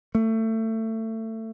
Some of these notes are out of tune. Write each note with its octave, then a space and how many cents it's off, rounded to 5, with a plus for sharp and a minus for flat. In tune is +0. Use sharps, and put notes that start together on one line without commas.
A3 +25